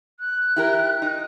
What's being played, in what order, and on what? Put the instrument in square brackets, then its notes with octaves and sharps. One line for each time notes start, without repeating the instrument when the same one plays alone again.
[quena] F#6
[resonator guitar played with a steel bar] E4 G4 A#4
D#4